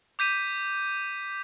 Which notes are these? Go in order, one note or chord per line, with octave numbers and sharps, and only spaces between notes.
D6 G6 B6 D#7